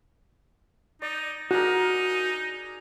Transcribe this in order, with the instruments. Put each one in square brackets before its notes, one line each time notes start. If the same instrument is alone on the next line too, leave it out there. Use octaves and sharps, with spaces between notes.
[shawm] D#4 [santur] D5
[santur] D4 G#4 A#4 [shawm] D#4 [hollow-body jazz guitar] F#4 F#5